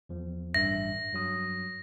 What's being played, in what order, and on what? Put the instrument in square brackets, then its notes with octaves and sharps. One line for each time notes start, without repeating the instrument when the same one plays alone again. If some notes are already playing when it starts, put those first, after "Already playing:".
[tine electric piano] E2 F3
[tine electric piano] A1 G2 E5 [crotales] A#6
[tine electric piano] G2 F#3 D#6